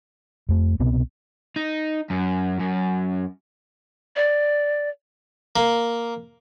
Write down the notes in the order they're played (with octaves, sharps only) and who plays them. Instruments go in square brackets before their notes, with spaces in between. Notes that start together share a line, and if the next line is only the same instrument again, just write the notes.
[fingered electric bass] F2 A3
C2 B2 B3 C4
[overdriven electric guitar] D#4
F#2
F#2
[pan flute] D5
[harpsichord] A#3